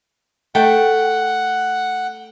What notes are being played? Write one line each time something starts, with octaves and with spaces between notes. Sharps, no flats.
A3 F#5 G5